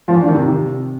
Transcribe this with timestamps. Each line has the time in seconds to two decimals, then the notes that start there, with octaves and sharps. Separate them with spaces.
0.08 F3
0.15 E3
0.21 D4
0.28 D#3
0.34 C3